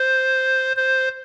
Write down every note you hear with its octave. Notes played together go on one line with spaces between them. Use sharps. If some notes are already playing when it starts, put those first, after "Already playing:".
Already playing: C5
C5